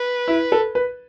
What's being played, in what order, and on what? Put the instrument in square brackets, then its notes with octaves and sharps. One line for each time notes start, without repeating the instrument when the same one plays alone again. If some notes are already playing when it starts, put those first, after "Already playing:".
Already playing: [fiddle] B4
[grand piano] E4
A4
B4